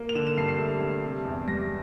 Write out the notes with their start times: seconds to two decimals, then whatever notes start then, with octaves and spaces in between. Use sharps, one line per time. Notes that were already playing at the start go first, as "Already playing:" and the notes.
Already playing: A#3
0.09 F7
0.15 D3 E7
0.27 E7
0.37 G2 C7
0.48 C7
0.59 A3
0.81 G2
1.04 C3
1.25 E2
1.47 G3 A#6